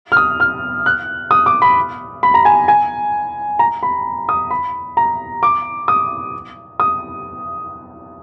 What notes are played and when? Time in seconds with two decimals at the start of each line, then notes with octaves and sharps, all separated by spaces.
0.12 F6
0.17 D#6
0.40 F6
0.86 F#6
1.31 D#6
1.46 D6
1.62 B5
2.23 B5
2.34 A#5
2.45 G#5
2.68 G#5
3.59 A#5
3.83 B5
4.29 D#6
4.51 B5
4.97 A#5
5.43 D6
5.88 D#6
6.80 D#6